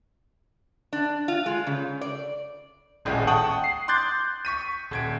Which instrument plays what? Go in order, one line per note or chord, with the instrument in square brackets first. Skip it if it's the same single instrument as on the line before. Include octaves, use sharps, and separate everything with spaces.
[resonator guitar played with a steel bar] D4
F4
G#3
C#3
D5
[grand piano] D#1 A1 A2 G#3
F#5 G5 A5 C#6 D#6 F#7
C7
C6 D6 F#6 G6 A6
C#6 B6 D#7
D#1 G#6 D7